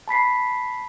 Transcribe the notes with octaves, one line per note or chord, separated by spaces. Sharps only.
A5 B5 B6 C7